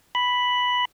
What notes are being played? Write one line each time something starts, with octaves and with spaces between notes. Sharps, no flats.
B5